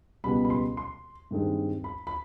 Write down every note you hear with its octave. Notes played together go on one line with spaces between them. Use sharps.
C#2 B2 G3 B3 B5
B5
C6
C6
G2 D#3 G#3 C4
B5
B5